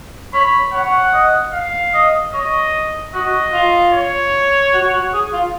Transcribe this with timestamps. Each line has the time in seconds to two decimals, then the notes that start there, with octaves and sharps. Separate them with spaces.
0.33 C#5 B5
0.73 C#5 F#5
1.13 D#5
1.53 F5
1.94 D#5
2.33 C#5 D#5
3.14 F#4 D#5
3.53 F4
3.93 C#5
4.73 F#4
4.93 F#4
5.13 G#4
5.33 F4